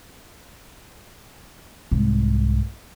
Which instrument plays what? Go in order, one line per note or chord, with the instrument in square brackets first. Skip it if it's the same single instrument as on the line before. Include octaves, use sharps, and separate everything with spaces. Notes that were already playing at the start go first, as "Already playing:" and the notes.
[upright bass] C2 G#2